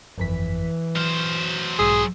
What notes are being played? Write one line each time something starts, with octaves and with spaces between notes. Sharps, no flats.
G1 F2 E3 B6
F#3 C5 F6
B1 G#2 G#4 E6